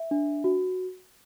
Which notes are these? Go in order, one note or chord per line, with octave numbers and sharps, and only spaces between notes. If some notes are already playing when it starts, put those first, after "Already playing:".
Already playing: E5
D4
F#4